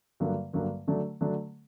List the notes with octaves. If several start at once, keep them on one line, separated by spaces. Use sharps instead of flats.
G2 D3 F#3 A#3
G2 D3 F#3 A#3
D3 F#3 A3 D4
D3 F#3 A3 D4